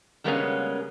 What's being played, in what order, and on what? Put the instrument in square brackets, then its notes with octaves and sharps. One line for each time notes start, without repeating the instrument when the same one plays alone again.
[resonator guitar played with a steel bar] C#3 G3 G#3 A#3 B3 C#4